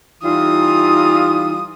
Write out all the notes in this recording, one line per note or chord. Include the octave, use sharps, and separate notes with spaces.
E3 G3 D#4 F4 D#6